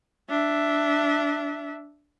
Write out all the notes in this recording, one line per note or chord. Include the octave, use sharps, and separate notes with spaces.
D4 E5